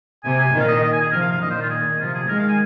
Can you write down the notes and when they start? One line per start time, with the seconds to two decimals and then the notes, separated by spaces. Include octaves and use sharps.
0.24 C3 G#5
0.39 G#5
0.54 A#2 D#3
0.60 F5
0.68 D#5
0.83 D#5
0.93 G#5
1.02 G#4
1.12 C3 F3 A#4
1.21 F5
1.32 F5
1.41 A#2 D#3 D#5
1.51 C5
1.61 F4
1.70 G#4
2.00 C3 F3 F4
2.14 G#4
2.28 D#3 G#3 A#4
2.39 F5
2.48 G#5